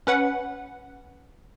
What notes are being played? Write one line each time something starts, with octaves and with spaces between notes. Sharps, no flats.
C#4 B4 F#5